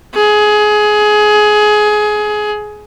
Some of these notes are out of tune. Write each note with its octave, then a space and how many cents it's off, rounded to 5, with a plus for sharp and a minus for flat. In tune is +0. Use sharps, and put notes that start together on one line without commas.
G#4 +20